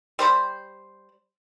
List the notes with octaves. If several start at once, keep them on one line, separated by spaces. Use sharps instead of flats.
G3 C5 B5